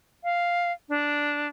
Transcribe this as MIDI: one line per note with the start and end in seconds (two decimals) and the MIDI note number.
0.24 0.72 77
0.89 1.48 62